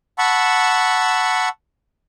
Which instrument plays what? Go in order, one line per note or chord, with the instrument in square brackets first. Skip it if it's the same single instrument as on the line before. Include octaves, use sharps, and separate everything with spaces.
[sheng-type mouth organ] F#5 A5 B5 C#6 E6